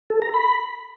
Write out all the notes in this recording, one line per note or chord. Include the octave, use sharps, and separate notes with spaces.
A4
A#5
B5